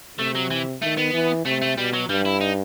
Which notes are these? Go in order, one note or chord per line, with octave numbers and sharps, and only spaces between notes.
C3 A3
F#3
E3
D#3 A3
B3
E3
C3 A3
A3
B2 G3
F#3
G2 G3
E4
D#4